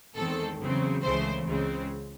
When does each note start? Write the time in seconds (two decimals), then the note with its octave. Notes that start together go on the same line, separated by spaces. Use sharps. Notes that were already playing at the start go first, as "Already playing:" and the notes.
0.16 E2 D#3 G#3 C4 A4
0.59 E2 C#3 F#3 C4
1.03 C#2 C#3 E3 A3 C4 C5
1.46 C#2 C#3 G#3 C4